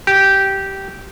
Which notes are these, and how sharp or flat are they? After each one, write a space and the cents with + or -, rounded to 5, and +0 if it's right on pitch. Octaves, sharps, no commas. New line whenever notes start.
G4 -10